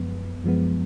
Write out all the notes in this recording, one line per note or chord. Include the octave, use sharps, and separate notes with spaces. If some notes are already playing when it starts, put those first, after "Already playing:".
Already playing: F#2 F3 G#3 B3
F#2 F3 G#3 B3